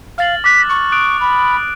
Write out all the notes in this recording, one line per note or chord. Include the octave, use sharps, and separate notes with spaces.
F5 F6 A6 F#7
D6 F#6 B6
C#6
D#6 F#6 D7
B5